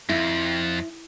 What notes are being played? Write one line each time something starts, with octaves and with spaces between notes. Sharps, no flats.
F2 E4